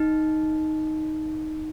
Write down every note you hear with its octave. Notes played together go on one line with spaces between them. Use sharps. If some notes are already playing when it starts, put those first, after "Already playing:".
Already playing: D#4